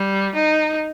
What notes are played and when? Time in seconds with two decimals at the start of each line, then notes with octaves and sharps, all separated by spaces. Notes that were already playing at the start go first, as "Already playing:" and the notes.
Already playing: G3
0.34 D#4